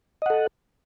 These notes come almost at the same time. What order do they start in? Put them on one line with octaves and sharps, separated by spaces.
D#5 F#5 A4